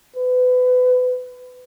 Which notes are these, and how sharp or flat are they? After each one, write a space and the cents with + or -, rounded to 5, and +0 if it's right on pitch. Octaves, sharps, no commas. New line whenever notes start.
B4 +30